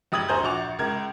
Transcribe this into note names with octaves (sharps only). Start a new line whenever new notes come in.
F#1 G4 D#6 G#6 F#7
D2 C5 G#5 A#5 G6 F#7
A#1 F#4 C#6 D6 F7
C#2 A#4 G#6